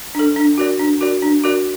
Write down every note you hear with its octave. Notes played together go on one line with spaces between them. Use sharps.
D4 A4
D4
F#4 A#4 D5
D4
F#4 A#4 D5
D4
F#4 A#4 D5